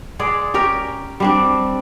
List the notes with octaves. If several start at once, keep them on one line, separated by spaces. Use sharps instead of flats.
G#3 G#4 D5
C#4 G4 A#4
G3 C4 D4